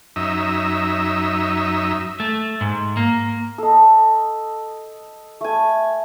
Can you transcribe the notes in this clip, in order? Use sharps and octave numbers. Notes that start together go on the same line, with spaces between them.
F#2 D#4 E5
A3
G#2
A#3
A4 D#5
A3 G#5